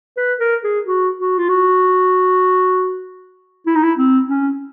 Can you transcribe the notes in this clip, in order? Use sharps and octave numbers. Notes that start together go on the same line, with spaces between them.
B4
A#4
G#4
F#4
F#4
F4
F#4
E4
D#4
E4
C4
C#4